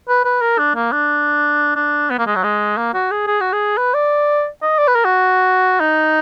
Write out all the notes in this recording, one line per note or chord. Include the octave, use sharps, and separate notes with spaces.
B4
B4
A#4
D4
A#3
D4
D4
B3
A#3
G#3
F#3
G#3
A#3
F#4
G#4
G#4
F#4
G#4
B4
D5
D#5
D5
B4
A#4
F#4
D#4